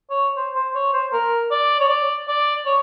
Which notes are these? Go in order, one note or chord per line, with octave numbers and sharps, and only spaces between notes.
C#5
C5
C5
C#5
C5
A#4
D5
C#5
D5
D5
C#5